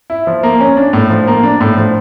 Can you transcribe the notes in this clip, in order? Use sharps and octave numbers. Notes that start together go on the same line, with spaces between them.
E4
F3
A#3
C#4
D4
A2
F3
A#3
D4
A2
F3